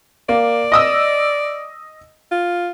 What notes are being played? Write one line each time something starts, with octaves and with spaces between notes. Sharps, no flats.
A#3 D5
D#5 D#6 E6
F4